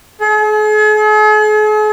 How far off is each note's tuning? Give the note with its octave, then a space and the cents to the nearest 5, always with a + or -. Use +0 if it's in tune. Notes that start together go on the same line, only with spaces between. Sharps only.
G#4 +45